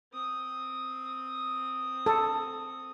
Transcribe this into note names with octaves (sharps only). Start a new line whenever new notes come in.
C4 D#6
A4